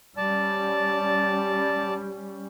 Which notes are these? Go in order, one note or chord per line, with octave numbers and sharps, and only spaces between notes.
G3 C#4 D5 A5